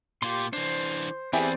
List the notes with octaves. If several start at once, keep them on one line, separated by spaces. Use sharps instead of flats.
A#2 F4 G4 C6
E3 D4 C5
E2 C4 E4 G4 G#4 B4 C5 D5